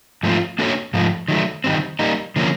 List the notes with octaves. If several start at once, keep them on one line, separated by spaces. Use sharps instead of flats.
G#2 F3 A3 C4 F4
A#3 D4 F#4 A4 C#5
G#2 F3 A3
D#3 F#3 A3
D#3 G3 C4
G3 A#3 D#4
D3 F3 A#3 C#4